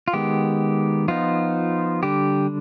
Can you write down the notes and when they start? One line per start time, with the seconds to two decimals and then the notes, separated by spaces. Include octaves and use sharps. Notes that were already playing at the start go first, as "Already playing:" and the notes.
0.08 F4
0.13 D#3 G#3 B3 G4
1.08 F3 B3 D#4 F4
2.03 D3 G3 D4 G4